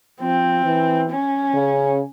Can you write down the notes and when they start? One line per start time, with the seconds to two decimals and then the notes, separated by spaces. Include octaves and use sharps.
0.21 F3 C4
0.65 E3
1.10 C#4
1.54 C#3